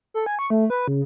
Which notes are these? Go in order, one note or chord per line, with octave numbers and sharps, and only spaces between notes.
A4
G#5
C#6
A3
B4
C#3